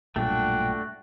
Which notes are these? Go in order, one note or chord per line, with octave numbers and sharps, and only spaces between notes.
B1 G2 A#2 A3 D4 F#4 G5